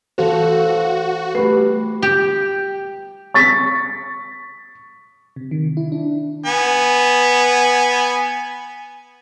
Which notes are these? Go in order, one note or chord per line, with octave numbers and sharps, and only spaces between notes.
E3 F#4 A4 C5 F5
A3 G4 B4
G4
C#6 A6 B6
C3
D#3
E4
D4
B3 G#5